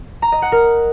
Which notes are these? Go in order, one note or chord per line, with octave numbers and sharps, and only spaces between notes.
A#5
D#5
F#5
A#4